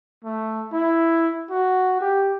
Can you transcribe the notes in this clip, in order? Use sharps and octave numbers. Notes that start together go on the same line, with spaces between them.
A3
E4
F#4
G4